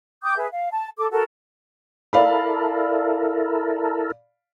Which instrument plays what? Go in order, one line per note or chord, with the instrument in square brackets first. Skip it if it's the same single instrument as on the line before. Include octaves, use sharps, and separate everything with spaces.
[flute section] G5 D6 D#6 G6
G#4 B4 E5
F5
A5
A4 D6
F#4 A4 A#4
[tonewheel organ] E4 A4 A#4 [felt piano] D5 F5 B5